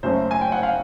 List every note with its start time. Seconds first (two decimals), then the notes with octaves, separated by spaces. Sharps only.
0.03 F#1 F#2 C#3 F#3 A3 C5
0.31 G#5
0.41 G5
0.52 F#5
0.63 F5